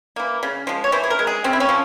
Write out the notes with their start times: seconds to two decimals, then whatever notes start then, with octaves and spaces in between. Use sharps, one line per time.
0.16 E3 A#3
0.43 C#3
0.67 F3 G#3
0.84 C#5
0.92 E3 C5
1.04 G#4
1.10 A#4
1.19 G#3
1.27 G#4
1.44 C#3 C4
1.53 E4
1.60 C#4
1.69 F3